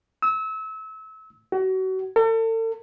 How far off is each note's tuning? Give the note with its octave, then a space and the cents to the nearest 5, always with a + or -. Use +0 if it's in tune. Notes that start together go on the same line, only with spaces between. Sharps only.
E6 -30
F#4 +30
A4 +40